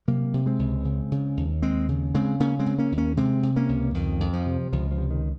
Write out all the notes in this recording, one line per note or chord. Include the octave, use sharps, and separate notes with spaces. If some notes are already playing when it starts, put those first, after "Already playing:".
C3 F#3 A#3
C3
G#3 C4
C#2
C#3
C#3
D#2
D#2 G#3 C4
C#3
C#3 G#3 C4
C#3 A#3 C#4
G#3 C4
C#3
A#3 C#4
D#2
A#3 C#4
C3 G#3 C4
C3
A#3 C#4
C#2
F2 D#3
F2
F3
C3
C#2 F3
F3
C3
D#3